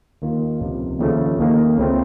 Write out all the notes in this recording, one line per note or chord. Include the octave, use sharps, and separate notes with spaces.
D#2 D#3 A#3 F4
C#2 C3 F3
D#2 C#3 F3 A3
D#2 D#3 A#3
C#2 C#3 A3 C4 F4